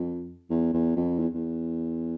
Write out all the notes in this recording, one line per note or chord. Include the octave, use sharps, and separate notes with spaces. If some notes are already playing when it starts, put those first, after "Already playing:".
Already playing: F2
E2
E2
F2
E2
E2